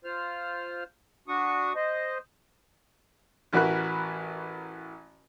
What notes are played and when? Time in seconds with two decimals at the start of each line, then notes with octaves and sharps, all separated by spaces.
0.04 F4 C5 F6
1.28 D4 F#4 C#6 D#6
1.75 C5 D#5
3.53 A1 E3 F#4 A#4 B5 F#6